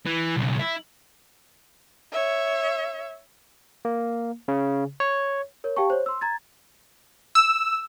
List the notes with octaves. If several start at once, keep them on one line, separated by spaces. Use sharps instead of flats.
E3
B1 C#3
E4
C#5 E5
A#3
C#3
C#5
A#4 C#5
G4 F5 G5 A5 C#6
C5 C#5
C6 E6
A#5 G#6 A6
E6